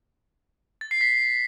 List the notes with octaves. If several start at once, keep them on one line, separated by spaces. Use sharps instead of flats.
A6
C7
B6